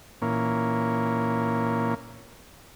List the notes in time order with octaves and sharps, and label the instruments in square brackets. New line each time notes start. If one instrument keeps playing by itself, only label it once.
[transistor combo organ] A#2 E3 A#3 C#4